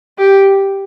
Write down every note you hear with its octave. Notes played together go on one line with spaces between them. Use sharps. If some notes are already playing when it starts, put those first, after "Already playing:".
G4